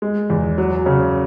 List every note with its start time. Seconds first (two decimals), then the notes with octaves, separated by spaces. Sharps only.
0.02 G#3
0.30 E2
0.58 F#3
0.86 C#3